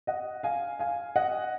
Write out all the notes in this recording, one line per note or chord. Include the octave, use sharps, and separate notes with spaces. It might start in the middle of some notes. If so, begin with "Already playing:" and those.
D#5 F#5
F5 G#5
F5 G#5
D#5 F#5